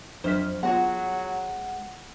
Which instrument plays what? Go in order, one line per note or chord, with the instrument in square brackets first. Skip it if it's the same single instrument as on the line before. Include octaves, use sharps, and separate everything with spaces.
[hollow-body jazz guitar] F2 [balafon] F#3 D4 [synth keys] C5 F6 B6
[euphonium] F#3 [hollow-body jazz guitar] G#3 F#4 C#5 [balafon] B3 F4 [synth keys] F#5